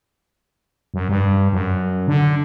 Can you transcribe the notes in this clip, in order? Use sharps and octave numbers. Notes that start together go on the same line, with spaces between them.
F#2
G2
F#2
D3